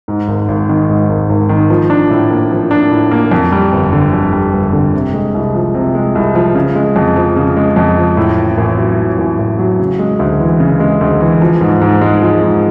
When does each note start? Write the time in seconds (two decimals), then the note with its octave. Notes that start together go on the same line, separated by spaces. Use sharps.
0.08 G#2
0.28 G#1
0.49 G#1
0.69 D#3
0.89 G#2
1.09 G#1
1.30 G#1
1.49 D#3
1.70 F3
1.90 D4
2.10 A2
2.30 A#3
2.51 F3
2.71 D4
2.91 A2
3.11 A#3
3.31 F2
3.52 G3
3.72 G1
3.93 D3
4.13 F2
4.33 G3
4.53 G1
4.73 D3
4.94 C3
5.14 G#3
5.34 C2
5.55 F3
5.74 C3
5.95 G#3
6.15 C2
6.35 F3
6.55 C#3
6.75 G#3
6.96 F2
7.16 F3
7.36 C#3
7.56 G#3
7.76 F2
7.97 F3
8.17 A2
8.37 A1
8.58 A1
8.78 F#3
8.98 A2
9.18 A1
9.39 A1
9.59 F#3
9.79 C#3
9.99 G#3
10.19 D2
10.40 E3
10.60 C#3
10.80 G#3
11.01 D2
11.21 E3
11.41 F3
11.61 G#2
11.81 G#2
12.01 G#3
12.22 F3
12.42 G#2